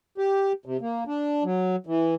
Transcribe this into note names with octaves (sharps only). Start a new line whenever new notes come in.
G4
C3
A#3
D4
F#3
E3